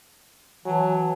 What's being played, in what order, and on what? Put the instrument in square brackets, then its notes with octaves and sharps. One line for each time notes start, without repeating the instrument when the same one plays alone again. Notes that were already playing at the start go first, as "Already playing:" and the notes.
[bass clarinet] E3 [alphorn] F#3 [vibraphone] G#5 A5